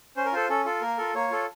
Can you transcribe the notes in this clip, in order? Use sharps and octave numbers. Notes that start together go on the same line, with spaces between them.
C#4 C5
A#4
F4 A4 C5
C#4 A4
F4 A4
A#3 A#4
F4 A4
A#3 C#5
F4 A4